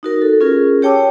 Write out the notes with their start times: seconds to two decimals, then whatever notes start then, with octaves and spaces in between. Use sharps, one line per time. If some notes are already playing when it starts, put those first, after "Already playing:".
0.03 D#4 F#4 A#4
0.22 A4
0.41 C#4 F4 G#4 A#4
0.82 G4 C#5 G5 A5 D6 E6